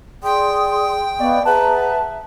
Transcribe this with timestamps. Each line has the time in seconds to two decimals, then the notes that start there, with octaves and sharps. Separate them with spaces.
0.23 G#4 D5 G5 C6 D#6
1.20 B3 D5 D#5 F5 C#6
1.45 G#4 B4 E5 F#5 A5 A#5